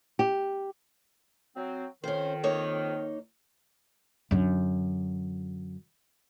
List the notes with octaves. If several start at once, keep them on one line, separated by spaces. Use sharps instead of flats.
G4
F#3 C4
F2 D#3 C#4 C5
A#3 D#4 C#5
F#2 D3